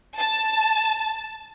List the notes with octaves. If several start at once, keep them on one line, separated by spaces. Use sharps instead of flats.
A5